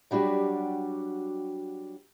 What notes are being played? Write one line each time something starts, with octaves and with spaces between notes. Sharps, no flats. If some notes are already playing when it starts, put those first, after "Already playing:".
F#3 G3 D4 F#4 G4